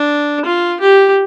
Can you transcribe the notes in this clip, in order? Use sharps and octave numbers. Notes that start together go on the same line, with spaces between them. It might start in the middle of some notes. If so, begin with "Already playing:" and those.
Already playing: D4
F4
G4